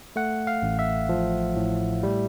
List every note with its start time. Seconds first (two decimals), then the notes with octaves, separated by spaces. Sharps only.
0.16 A3 F#5
0.47 F5
0.62 A1
0.79 E5
1.09 F3
1.56 A2
2.03 G3